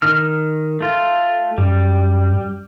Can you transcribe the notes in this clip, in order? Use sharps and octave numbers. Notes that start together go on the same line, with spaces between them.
D#3 F6
A3 F4
F#2 G3